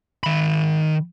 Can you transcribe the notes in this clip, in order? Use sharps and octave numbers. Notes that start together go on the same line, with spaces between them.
D#3 B5